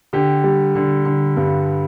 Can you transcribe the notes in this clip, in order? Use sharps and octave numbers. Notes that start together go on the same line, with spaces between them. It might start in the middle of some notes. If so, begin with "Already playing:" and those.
D3 G4
G3
D3
D3
G2